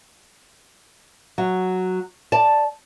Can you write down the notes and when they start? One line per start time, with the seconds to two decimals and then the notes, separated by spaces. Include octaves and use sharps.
1.38 F#3
2.32 D5 A5